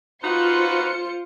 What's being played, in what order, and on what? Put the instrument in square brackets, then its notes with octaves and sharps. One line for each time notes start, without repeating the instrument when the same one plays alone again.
[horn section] D#4 F#4 B4 [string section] F4 C5 C#7